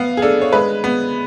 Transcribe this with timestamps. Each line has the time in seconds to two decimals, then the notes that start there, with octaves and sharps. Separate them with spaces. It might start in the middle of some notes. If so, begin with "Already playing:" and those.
Already playing: B3 F5
0.17 G#4
0.22 D4 A4
0.42 C#5
0.53 G#3 B4
0.84 B3